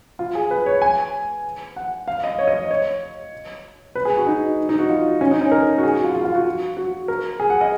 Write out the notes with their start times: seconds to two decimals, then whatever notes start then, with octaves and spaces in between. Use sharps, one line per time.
0.19 F4
0.35 G#4
0.51 B4
0.66 C#5
0.82 G#5
1.76 F#5
2.08 F5
2.24 D#5
2.39 C#5
2.48 D#5
2.54 C#5
2.71 C#5
3.95 B4
4.05 G#4
4.16 F#4
4.27 D#4
4.69 D#4
4.79 F#4
4.90 F4
5.21 C#4
5.31 D#4
5.41 C#4
5.52 A#4
5.78 F#4
5.83 G#4
5.94 F#4
6.04 F4
6.15 F4
6.25 F4
6.35 F#4
6.77 F#4
7.08 A#4
7.40 G#4
7.50 F#5
7.61 D#5